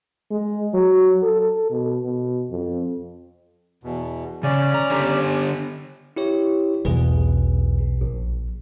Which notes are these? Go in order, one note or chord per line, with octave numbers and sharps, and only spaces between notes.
G#3
F#3
A4
B2
B2
F2
E2 B2
C#3 C#4 D5
A#5
D3 G4
E4 G4 C#5
B1 E2 G#4 B4
A#1